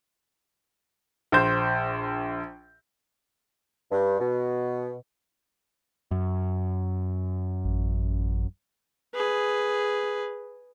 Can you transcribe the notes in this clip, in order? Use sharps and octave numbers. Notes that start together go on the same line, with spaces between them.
A#1 C5 G6
G2
B2
F#2
A1
G#4 B4